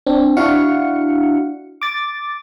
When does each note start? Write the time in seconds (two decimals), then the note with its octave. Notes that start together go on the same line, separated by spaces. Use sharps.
0.06 C4 D4
0.37 D4 E4 F#4 F5 F#5 C#7
1.82 D6 A6